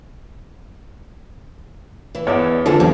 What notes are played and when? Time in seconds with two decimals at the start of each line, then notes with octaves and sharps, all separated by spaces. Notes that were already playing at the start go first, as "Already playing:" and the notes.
2.15 E3
2.27 E2 C#5 D5 E5
2.66 D3 F3 A#3 B3 D4 G#4 A4 E5
2.80 E2 F#3 G3 E4 G4